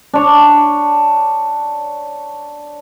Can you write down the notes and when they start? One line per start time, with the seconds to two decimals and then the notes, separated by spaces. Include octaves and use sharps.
0.14 D4 C#5